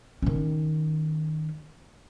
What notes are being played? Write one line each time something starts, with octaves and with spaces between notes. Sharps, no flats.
D#3 C#4